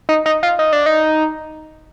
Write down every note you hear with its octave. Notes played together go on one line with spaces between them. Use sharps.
D#4
D#4
F4
D#4
D4
D#4